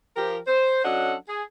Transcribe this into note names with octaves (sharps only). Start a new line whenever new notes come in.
F3 G4 A#4
C5
F#3 C#4 D4 A4 D#5 F#5
G#4